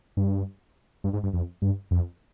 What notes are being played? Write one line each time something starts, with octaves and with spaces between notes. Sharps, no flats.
G2
G2
G#2
G2
F2
G2
F2